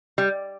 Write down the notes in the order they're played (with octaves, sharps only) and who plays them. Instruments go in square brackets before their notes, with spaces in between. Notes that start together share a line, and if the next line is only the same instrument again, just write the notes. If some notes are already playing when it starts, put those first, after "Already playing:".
[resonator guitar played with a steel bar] G3